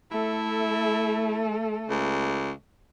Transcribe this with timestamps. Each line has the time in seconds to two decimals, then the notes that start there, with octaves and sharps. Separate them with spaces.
0.11 A3 E4 A4
1.90 C#2